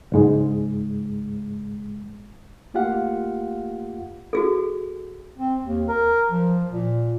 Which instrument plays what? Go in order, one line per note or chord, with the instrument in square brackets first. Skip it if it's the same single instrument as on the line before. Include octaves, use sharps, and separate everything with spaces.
[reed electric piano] C#2 G#2 G#3
A3 A#3 F4 G4 F5 F#5
[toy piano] F#4 G#4 A4
[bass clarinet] C4
D#2
A#4
F3
A#2